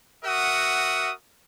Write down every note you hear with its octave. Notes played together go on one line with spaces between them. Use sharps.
F#4 A#4 E5 F#5 D#6